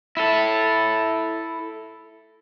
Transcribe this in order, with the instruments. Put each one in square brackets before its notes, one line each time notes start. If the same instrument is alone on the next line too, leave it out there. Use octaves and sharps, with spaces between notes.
[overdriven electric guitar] E4 A4